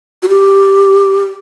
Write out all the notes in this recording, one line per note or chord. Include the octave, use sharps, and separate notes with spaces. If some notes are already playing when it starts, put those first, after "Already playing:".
F#4
G4